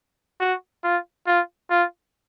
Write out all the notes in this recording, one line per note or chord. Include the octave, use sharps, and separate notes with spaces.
F#4
F4
F4
F4